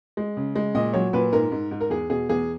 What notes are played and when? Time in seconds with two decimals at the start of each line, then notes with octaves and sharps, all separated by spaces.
0.17 G#3
0.37 C#3
0.55 G#3
0.75 A#2 D#5
0.93 F#3 C#5
1.13 A#2 B4
1.32 G#2 A#4
1.52 G#2
1.71 G#2
1.81 A#4
1.90 E2 G#4
2.10 B2 G#4
2.29 E2 G#4